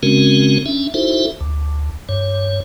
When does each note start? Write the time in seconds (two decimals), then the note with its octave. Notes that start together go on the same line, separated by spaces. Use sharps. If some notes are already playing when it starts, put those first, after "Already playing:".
0.03 C#3 G#3 C4 C#4 F#4 A#4
0.66 C#4 D4 E5
0.94 D#4 E4 F#4 A4 C5 E5
1.41 D2
2.09 G2 C#5